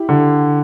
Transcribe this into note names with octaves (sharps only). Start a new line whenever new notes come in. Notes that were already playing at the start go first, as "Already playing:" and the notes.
Already playing: E4 G4
D3